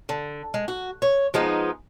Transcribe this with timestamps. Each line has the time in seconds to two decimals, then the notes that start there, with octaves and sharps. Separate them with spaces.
0.09 D3
0.54 G#3
0.68 F#4
1.02 C#5
1.34 F3 G#3 B3 D#4